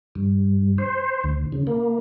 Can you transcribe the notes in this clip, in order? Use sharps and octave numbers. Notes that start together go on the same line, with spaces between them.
G2
C5
D2
C#3
A#3